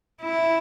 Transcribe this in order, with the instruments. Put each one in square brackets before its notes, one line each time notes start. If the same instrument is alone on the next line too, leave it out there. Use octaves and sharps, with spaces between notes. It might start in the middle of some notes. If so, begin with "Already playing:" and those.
[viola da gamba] E4